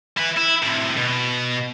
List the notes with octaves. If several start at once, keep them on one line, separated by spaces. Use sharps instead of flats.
E4 B4
E4
A2 C3
B2